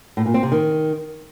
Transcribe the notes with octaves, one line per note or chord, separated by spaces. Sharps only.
A2
A#2
C4
C3
D#3